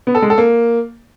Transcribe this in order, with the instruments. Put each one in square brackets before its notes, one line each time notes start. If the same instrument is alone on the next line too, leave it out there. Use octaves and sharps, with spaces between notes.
[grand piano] B3
A4
G#3
A4
A#3